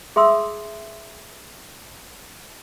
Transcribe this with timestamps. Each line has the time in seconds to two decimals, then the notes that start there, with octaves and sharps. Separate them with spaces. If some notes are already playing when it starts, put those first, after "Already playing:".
0.16 G#4 E5 C6 D#6 E6